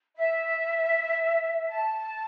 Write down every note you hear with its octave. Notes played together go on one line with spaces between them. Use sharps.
E5
A5